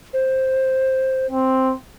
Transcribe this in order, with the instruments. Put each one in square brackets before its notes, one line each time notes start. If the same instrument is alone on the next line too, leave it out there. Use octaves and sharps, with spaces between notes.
[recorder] C5
[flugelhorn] C4